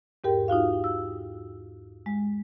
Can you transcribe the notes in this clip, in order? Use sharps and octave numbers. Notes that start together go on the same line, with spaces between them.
E2 G#2 G4 A#4 G5
D#4 F4 F#4 F5
E6
G#3